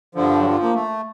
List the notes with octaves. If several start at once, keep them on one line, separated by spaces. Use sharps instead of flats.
G2 D3 F3
F#3
F3
A#3
A3